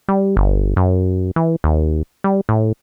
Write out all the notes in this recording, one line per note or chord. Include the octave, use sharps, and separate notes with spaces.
G3
G1
F#2
E3
D#2
G3
A2